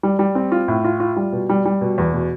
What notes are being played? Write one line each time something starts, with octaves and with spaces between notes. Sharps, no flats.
G3
G3
C4
F4
A2
F4
F4
G3
B2
G3
G3
B2
E2
B2